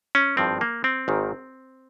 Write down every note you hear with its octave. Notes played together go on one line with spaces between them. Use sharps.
C#4
G#1 G2 F3 C4
A#3
C4
G#1 G#2 D#3